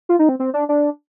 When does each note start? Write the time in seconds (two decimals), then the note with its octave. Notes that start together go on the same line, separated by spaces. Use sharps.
0.09 F4
0.19 D#4
0.29 C4
0.39 C4
0.54 D4
0.69 D4